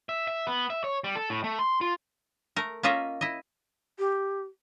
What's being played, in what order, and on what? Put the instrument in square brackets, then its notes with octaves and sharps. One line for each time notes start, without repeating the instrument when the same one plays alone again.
[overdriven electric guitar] E5
E5
B3
E5
C#5
G3
A4
A2
A3
C6
F4
[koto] A3 A#4
A#3 C#4 F4 D#5 E5
E4 D#5
[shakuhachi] G4